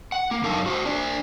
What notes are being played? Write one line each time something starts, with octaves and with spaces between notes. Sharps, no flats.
F#5
A#3
F#2 D#4 A4 A#4 F5 A5
F#4 C5
D4 C5 D5